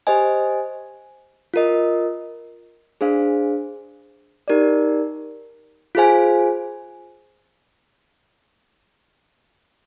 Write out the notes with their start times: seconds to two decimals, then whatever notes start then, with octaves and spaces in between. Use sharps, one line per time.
0.07 G4 C5 D#5 G#5
1.54 F4 A#4 D#5
3.01 D4 G#4 C5 F5
4.48 D#4 G4 A#4 D5
5.95 F4 G#4 C5 F5 G#5